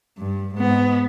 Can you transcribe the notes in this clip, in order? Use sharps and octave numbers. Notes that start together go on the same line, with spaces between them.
G2
G#2 B3